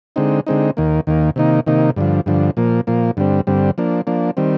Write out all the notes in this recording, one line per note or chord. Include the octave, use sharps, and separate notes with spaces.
D3 G#3 C4 D#4
D3 G#3 C4 D#4
D#2 D#3 A#3
D#2 D#3 A#3
C3 D#3 A#3 D#4
C3 D#3 A#3 D#4
G2 D3 F3
G2 D3 F3
A#2 F3 A#3
A#2 F3 A#3
G2 D3 G3 C4
G2 D3 G3 C4
F3 A#3 D4
F3 A#3 D4
D#3 G3 C4